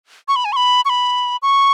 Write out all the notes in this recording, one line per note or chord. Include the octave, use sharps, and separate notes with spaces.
C#6
B5
G#5
C#6
B5
C#6
B5
C#6